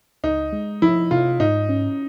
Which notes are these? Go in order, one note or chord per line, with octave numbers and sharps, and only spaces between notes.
C#2 D#4
G#3
F3 E4
C3 F4
G#2 D#4
C#4